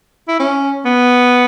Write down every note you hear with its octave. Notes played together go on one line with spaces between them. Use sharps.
E4
C#4
B3